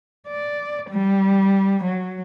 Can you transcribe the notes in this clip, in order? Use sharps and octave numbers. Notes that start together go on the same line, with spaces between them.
D5
G3
F#3